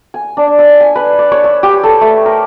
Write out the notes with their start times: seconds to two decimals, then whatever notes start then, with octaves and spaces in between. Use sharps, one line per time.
0.14 G#5
0.37 D4
0.59 E6
0.81 G#5
0.96 B4
1.19 D5
1.32 C#5
1.44 E6
1.63 G4
1.83 A4
2.01 A3
2.26 A#4